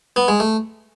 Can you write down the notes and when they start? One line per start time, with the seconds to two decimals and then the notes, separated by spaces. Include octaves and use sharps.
0.16 B3
0.28 G#3
0.40 A3